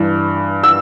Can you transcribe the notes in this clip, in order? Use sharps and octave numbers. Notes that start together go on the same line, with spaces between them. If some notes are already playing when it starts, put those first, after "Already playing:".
Already playing: G2 E3
E6